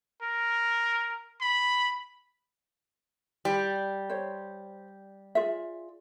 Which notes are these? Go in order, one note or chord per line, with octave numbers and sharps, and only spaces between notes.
A#4
B5
G3
C5 C#5
F4 G#4 E5